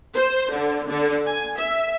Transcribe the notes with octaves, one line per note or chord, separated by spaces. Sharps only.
C5
D3
D3
G#5
E5